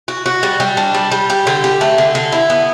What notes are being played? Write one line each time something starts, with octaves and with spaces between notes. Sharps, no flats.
F#4
F#4
G3
G3
D4
G3
G3
G4
D3
G4
A3
D3
D3
E4
B3